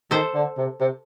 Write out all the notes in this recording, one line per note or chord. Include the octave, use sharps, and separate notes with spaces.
D#3 A4 C5
D3
C3
C3